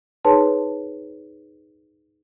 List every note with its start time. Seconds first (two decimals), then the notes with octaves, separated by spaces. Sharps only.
0.25 D#4 G#4 B4 C#5 A5 C6